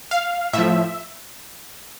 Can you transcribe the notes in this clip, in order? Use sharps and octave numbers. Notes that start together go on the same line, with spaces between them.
F5
A2 F3 E5